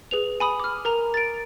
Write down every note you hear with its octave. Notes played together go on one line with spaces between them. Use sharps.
G#4 B4 F7
G#5 B5 D#6
D6 F6
A#4 A#5 F7
A6 D7